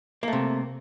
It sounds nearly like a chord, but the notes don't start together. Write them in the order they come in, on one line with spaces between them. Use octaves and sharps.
A#3 A3 C3